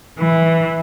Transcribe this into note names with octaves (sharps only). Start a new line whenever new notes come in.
E3